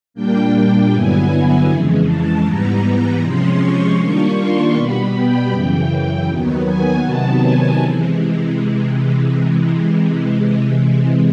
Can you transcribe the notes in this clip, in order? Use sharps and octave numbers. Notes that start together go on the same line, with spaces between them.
A#2 G3 A#3 D4 G5
G2 D3 F#3 B3 E4 G#5
F2 C#3 E3 G#3
A5
G#2 E3 G3 B3 A#5
C3 F3 G#3 C#4 C6
C#6
D#3 G3 A#3 D4 F4
C6
B2 G3 B3 B5
G5
F#2 C#3 E3
D#2 D#3 F#3 B3
G#5
C3 D#3 F#3 B3 A5
G#5
C3 E3 G#3